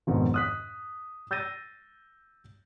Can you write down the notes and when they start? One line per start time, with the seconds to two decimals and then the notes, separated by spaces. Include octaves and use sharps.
0.07 A#1 F2 G#2 B2 D#3
0.34 D#6 F#6 B6
1.31 E6 G6 A6 A#6 D#7